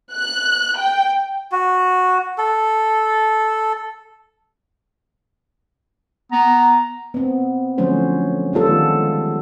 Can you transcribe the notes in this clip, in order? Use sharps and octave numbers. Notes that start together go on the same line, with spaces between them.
F#6
G5
F#4
A4
B3 A#5
B3 C4
D3 F3 F#3 A3 C#4 C5
G3 B3 F4 A4
D#3 G#3